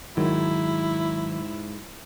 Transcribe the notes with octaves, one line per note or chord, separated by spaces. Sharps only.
G#2 D#3 F#3 E4